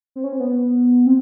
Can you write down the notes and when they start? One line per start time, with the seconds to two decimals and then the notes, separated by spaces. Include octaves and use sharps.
0.16 C4
0.24 C#4
0.32 C4
0.40 B3
1.06 C4